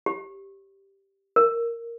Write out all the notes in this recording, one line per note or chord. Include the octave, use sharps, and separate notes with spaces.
G4
A#4